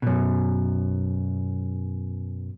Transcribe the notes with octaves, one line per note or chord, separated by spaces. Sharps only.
F#2 B2